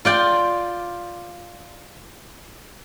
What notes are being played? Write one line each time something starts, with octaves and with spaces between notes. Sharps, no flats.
F4 D5 G5